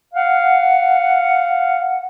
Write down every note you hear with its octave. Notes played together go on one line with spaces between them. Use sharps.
F5 F#5